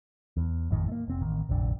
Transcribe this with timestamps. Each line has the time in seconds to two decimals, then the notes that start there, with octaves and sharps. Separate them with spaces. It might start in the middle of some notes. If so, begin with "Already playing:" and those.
0.37 E2
0.71 G#1 F2 A2 D#3
0.88 A3 A#3
1.08 F1 C4
1.21 A1 D#3
1.49 F1 A#1 F#2 D3